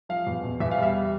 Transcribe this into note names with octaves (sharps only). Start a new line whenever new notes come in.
F3 F5
E2
B2
E2 E5
F5
G3 E5